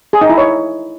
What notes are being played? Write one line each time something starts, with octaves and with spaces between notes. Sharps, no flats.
G#4
D#4
E4
C#5